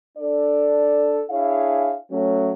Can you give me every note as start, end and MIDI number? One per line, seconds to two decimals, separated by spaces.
0.18 1.22 62
0.18 1.22 69
0.18 1.22 74
1.30 1.96 62
1.30 1.96 64
1.30 1.96 68
1.30 1.96 73
1.30 1.96 76
1.30 1.96 77
2.11 2.52 54
2.11 2.52 57
2.11 2.52 61